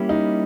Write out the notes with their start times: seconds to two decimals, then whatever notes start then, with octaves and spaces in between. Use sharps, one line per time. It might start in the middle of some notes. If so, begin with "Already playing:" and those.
Already playing: G3 A#3 C#4 E4 G4
0.09 D#4